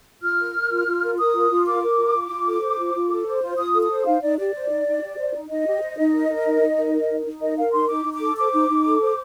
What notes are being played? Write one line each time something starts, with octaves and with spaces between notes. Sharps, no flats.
F4 F6
A#4
A#4
F4
F4
A#4
A#4 D#6
F4
F4
A#4 D6
A#4
F4
F4
F4
A4
C5
F4
F4
A4
C5
F4
F4 D#6
A4
D#6
C5
D#4 F5
D#4 D5
G4 D5
C5
D#4
D#4
G4
C5
D#4
D#4 D#5
G4
C5
D#4
A#4
A#4
D#4
D#4
A#4
A#4
D#4
D#4
A#4 D#5
A#4 F5
D#4 C6
D#4 D6
D#4
D6
A4
C5 D6
D#4
D#4
A4
C5